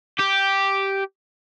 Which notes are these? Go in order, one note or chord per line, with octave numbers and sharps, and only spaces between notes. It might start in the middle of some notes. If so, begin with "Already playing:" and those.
G4